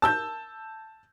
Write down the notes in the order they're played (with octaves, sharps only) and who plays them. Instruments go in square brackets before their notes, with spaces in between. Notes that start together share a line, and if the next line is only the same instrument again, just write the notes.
[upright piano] A5 E6 G6